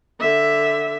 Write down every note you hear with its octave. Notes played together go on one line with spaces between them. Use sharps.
D3 E5